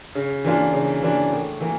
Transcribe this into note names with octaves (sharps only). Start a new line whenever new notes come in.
C#3
E3 A#3 D4 F4
C#3
E3 A#3 D4 F4
A2
E3 A#3